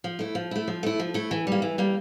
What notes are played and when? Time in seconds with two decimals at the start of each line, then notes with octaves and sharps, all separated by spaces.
0.04 F3
0.19 A3 E4
0.35 F3
0.51 A3 E4
0.68 F3
0.83 A3 E4
1.00 F3
1.14 A3 E4
1.31 E3
1.47 G3 A#3
1.62 E3
1.78 G3 A#3